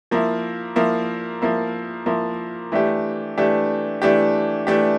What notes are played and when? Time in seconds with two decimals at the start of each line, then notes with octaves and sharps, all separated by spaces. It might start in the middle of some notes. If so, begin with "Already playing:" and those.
0.11 F3 A#3 E4
0.76 F3 A#3 E4
1.42 F3 A#3 E4
2.06 F3 A#3 E4
2.72 E3 A3 D4 G4
3.38 E3 A3 D4 G4
4.02 E3 A3 D4 G4
4.67 E3 A3 D4 G4